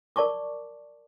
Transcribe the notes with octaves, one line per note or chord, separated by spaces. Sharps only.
A#4 D5 A5 C#6 D6